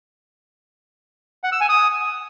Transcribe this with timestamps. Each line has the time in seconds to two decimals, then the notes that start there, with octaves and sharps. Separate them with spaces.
1.44 F#5
1.52 E6
1.61 G#5
1.69 D#6